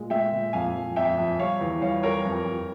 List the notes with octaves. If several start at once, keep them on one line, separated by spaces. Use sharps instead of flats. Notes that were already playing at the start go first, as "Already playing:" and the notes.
Already playing: A#2 G#3
G#3 E5 G5
A#2
F2 F5 G#5
F2
F2 E5 G5
F2
G3 C#5 F5
E2
G3 C#5 F5
G3 A#4 C#5
F2
F2